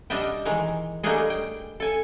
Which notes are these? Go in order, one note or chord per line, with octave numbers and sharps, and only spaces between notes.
B2 G3 D4 D#5 E5 G5
D#3 E3 G#3
G3 A3 A#3 D4 G#4 D#5
G5
A4 G#5